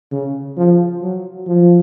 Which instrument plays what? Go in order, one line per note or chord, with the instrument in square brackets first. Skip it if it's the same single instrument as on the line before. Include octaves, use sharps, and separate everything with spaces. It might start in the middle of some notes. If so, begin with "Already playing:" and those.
[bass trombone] C#3
F3
F#3
F3